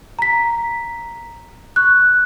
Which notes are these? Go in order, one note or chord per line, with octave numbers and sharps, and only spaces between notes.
A#5 B6
C#6 F#6